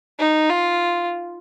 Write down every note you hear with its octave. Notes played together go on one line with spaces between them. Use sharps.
D#4
F4